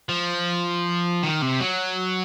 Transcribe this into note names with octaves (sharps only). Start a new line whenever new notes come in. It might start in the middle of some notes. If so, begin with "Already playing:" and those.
F3
D#3
C3
F#3